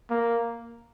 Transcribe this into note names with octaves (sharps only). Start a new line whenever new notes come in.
A#3